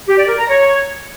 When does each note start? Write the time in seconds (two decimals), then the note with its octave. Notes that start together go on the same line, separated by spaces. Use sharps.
0.08 G4
0.18 D5
0.28 A#4
0.39 A#5
0.49 C#5